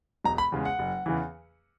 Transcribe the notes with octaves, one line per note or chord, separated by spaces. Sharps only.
E1 A#5
B5
E2 C#3 G#3
F#5
F#1
E2 C#3 E3